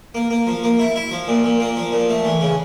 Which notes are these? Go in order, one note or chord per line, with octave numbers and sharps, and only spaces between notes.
A#3
A#3
F3
A#3
E4
E4
F3
A#2
A#2
A#3
F3
A#2
A3
E3
C#3